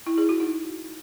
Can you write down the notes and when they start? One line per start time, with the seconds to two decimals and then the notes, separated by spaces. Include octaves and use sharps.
0.06 E4
0.18 G#4
0.29 F#4
0.40 D#4